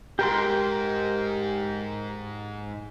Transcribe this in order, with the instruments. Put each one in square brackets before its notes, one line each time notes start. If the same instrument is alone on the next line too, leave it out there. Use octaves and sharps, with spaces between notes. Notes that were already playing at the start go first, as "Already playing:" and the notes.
[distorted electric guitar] G#2 [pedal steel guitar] G4 A#4 C6